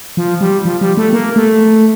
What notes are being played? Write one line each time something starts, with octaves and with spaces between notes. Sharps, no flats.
F3
G3
F3
G3
A3
A#3
A3